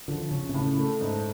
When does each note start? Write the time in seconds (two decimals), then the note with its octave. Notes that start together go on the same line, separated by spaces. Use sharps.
0.08 D3 F3
0.31 C#3 C#4
0.49 C3
0.54 A2 C#3
0.78 A3
1.01 G#2